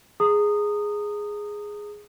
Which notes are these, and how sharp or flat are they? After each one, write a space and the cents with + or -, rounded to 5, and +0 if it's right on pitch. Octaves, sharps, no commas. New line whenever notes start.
G#4 +0 A#5 -25 D#6 -15